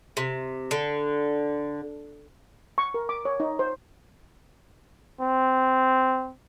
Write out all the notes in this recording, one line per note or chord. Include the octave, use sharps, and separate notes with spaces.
C3
D3
C#6
A#4
D6
C#5
D#4
C5
C4